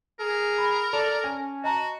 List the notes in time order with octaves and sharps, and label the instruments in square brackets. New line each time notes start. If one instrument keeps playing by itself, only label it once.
[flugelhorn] G#4 [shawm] A#4
[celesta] B5
[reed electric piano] A4 [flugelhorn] D5 [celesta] A5 F7
[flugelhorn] C#4 [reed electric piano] G#5
[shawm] F#4 [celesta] D#5 A5 A#5